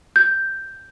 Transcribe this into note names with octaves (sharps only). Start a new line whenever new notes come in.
G6